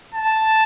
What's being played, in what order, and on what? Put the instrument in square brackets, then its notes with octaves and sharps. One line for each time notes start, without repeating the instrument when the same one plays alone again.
[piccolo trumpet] A5